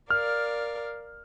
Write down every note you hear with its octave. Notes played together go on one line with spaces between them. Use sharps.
A#4 D5 F5 F6